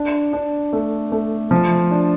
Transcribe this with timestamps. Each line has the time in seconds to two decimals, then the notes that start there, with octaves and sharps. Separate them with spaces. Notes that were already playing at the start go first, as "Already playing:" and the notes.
Already playing: D4
0.33 D4
0.73 A3
1.12 A3
1.51 F3
1.91 D4